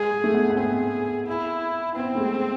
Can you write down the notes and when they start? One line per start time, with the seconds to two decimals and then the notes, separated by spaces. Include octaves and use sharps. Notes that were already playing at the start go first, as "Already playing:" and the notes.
Already playing: G#3 G#4
0.11 G#3
0.24 A3
0.34 B3
0.50 B3
0.58 C4 G#4
1.27 E4
1.96 B3 C4
2.15 A3
2.20 G#3